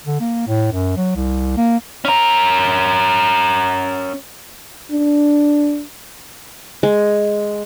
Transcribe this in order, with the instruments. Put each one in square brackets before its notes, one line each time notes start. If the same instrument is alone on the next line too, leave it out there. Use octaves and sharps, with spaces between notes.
[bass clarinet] D3
A#3
A2
F#2
F#3
C2
A#3
[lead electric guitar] C#4 A#4
[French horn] D4
[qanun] G#3